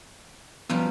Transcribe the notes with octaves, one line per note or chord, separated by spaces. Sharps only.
F#2 F3 G3 B3